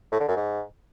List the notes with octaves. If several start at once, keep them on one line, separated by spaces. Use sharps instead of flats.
A2
D3
F#2
G#2